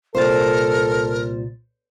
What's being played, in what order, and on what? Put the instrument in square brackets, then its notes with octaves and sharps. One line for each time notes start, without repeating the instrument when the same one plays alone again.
[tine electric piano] C2 A#2 A6 [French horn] A4 [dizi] A#4 [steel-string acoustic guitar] C5